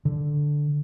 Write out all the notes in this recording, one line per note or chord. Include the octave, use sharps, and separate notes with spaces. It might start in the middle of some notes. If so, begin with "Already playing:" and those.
D3